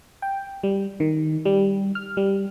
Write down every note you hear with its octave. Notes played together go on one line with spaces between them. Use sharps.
G5
G3
D#3
G3
F6
G3